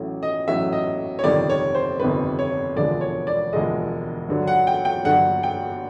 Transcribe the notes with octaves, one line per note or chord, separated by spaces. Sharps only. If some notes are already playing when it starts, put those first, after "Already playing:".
Already playing: A1 A2 F#3
D#5
A1 A2 F#3 E5
D#5
C#5
G1 F2 C3 D#3 G3 D5
C#5
C5
G1 F2 C3 D#3 G3 B4
C#5
E1 D2 D3 F3 G#3 D5
C#5
D5
E1 D2 D3 F3 G#3 D#5
G2 D3 F#3
F#5
G5
G5
G2 D3 F#3 F#5
G5